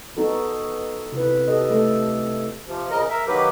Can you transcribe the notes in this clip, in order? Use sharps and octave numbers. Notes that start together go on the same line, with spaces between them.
B3 D#4 F#4 A4
C3 E4 B4
G4 A4 D#5
A3 A4
C3 F3
C#3 A#4 D#5
A#4 E5
D#3 F#3 A#3 G4 B4